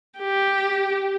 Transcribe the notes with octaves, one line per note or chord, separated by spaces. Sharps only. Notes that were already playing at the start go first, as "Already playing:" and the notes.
G4